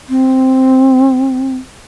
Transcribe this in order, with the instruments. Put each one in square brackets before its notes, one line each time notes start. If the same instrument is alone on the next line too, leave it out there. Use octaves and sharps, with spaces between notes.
[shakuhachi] C4